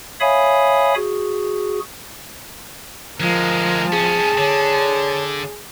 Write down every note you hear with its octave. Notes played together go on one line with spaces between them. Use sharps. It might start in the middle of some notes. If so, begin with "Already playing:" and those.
C#5 E5 F5 G#5 B5 D#6
F#4 G#4
D2 F3 G#3 A#4
C2 C#4 G#4 A5
D3 C#5